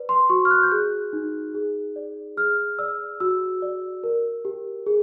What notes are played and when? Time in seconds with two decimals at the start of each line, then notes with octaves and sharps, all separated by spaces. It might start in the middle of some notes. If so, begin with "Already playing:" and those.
Already playing: B4 D5
0.09 C6
0.30 F#4 C#6
0.45 F6
0.51 F#6
0.63 G6
0.71 G#4 F#6
1.13 D#4
1.54 G#4
1.96 D5
2.37 G#4 F6
2.79 D5 E6
3.20 F#4 E6
3.62 D5
4.03 A#4
4.45 G4
4.87 G#4